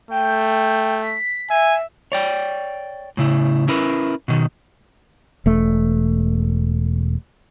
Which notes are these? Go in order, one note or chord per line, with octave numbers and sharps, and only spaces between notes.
A3 G5
B6
E5 G#5
C#5 D5 G5
A2 C#3 E4
C#4 E4 A#4 B4
B2 D#3
E1 A3